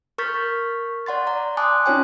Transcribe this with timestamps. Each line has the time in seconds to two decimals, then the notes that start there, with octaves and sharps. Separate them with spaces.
0.18 A#4 C#6 F6 G6 A6 B6
1.06 D5 F#5 C6 A6
1.27 D5 A#5
1.57 G#5 A5 C6 D6 D#6 F#6
1.86 C#4 D#4 F4 C#5 G5 G#5